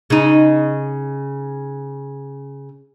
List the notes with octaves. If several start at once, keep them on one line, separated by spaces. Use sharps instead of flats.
C#3 D#4